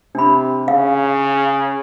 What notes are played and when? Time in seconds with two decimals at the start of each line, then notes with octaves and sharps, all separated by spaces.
0.15 C3 D4 B5
0.68 C#3 F5